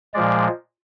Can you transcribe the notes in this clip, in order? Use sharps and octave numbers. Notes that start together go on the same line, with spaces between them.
A#2 F3 G#3 D5